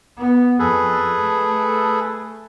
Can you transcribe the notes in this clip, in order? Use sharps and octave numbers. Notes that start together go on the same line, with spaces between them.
B3
F2 G#4 A4 B4
A3